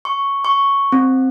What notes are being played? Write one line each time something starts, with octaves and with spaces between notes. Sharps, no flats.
C#6
C#6
C4